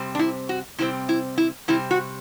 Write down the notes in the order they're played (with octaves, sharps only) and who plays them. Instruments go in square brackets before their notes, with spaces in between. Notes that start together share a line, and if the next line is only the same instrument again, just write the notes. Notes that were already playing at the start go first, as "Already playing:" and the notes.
Already playing: [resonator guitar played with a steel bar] C3 G3 C4
D4
E4
F#4
C3 G3 C4 E4
E4
E4
C3 G3 C4 E4
F#4